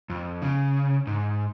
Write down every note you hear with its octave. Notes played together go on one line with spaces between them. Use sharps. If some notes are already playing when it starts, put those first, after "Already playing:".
F2
C#3
G#2